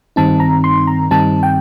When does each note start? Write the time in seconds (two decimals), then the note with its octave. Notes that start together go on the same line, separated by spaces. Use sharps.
0.16 G2 D#3 G3 C4 D#4 A5
0.40 A#5
0.64 C6
0.87 A#5
1.11 G2 D#3 G3 C4 D#4 A5
1.43 G5